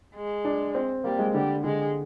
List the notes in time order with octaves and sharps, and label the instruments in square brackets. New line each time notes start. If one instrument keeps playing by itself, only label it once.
[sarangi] G#3
[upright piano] D4
C4
[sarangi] G3 [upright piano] A#3
[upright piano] G#3
[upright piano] D3 [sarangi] G3
[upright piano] D3 [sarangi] G#3